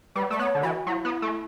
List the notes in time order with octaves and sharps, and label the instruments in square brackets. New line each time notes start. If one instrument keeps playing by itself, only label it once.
[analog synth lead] G3 [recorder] B4
[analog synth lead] A3 [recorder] D5
[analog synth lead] B3 [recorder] C#5
[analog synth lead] D3
[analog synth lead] E3 [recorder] F#4
[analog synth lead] F#3 [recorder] E4
[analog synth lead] B3
A3